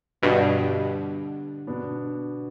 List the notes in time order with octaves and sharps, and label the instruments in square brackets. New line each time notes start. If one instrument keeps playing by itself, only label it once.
[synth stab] G2 B2 [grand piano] D3 G3 D4
[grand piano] B2 B3 D4